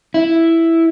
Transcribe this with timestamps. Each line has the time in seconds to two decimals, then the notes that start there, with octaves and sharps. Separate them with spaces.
0.14 E4